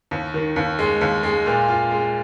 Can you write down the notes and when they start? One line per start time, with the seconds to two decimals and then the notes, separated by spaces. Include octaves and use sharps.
0.11 D#2
0.34 D#3
0.56 D#2
0.79 G#3
1.01 D#2
1.23 G#3
1.46 A#2
1.68 F4
1.91 G#3